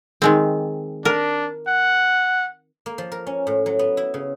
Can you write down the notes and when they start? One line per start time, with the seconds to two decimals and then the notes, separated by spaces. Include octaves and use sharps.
0.22 D#3 G#3 C4
1.05 D4 A#4
1.68 F#5
2.86 A#3
2.98 F3
3.12 A#4
3.27 C#4
3.47 A2
3.66 F#3
3.79 B3
3.97 E4
4.14 C#3